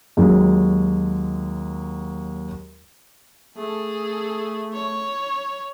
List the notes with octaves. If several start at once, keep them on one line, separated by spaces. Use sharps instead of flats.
D#2 F#3 G#3
A3 G#4 A4
C#5